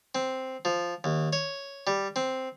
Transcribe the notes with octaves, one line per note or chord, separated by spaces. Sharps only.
C4
F3
D#2
C#5
G3
C4